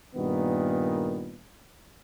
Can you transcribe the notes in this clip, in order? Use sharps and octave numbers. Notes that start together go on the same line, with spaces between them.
G2 A#2 D#3 B3